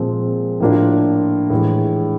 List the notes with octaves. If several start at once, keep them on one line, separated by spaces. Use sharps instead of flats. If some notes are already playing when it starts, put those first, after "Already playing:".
Already playing: A#2 F3 G#3 C4
A2 F3 A#3 D4 F4
A2 E3 G#3